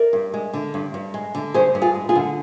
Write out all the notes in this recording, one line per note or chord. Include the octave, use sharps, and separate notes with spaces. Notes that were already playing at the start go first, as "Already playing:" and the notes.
Already playing: A#4 D5
G2
G#3
D3
G2
G2
G#3
D3
G2 G#4 C5
G2
F4 G#4
G#3
F4 G#4
D3